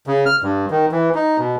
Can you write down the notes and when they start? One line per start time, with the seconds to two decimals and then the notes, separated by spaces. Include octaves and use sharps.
0.07 C#3
0.26 F6
0.42 G2
0.71 D#3
0.92 E3
1.15 D#4
1.39 B2